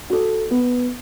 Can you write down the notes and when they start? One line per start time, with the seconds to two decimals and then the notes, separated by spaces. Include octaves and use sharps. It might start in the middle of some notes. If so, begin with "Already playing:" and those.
0.10 F#4 A4
0.51 B3